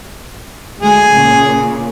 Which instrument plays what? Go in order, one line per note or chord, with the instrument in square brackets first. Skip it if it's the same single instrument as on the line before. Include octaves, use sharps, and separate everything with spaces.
[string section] D2 G#3 [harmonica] G#4
[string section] A#2 C#3